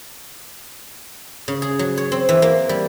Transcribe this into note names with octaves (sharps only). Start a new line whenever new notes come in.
C#3
G#4
F#3
C#5
C4
E3
A#3
G3